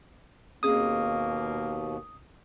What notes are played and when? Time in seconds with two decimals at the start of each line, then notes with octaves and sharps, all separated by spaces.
0.63 D#2 B2 A#3 C4 C#4 G#4 D#6